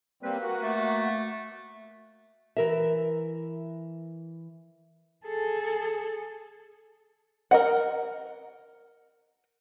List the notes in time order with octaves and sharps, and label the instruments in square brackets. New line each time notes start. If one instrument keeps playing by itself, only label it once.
[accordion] G3 A#3 C4 [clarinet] B4
[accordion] A#3 F#4
[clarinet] A3
[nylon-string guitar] E3 A#4 E5
[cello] G#4 A4
[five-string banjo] A#4 D#5 F#5